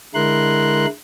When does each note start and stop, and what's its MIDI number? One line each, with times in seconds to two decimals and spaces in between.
0.15 0.86 50
0.15 0.86 56
0.15 0.86 64
0.15 0.86 70
0.15 0.86 84
0.15 0.86 90